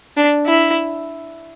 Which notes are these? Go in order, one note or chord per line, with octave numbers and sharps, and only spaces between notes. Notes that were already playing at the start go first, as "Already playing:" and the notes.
D4
E4